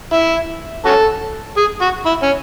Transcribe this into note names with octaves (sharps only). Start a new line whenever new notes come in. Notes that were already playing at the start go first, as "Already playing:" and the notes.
E4
C#4 F#4 A4
G#4
F#4
E4
C#4